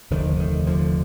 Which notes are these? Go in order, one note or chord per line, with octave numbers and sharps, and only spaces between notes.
F1 D#2 D3 D#3
D#3
D3 F3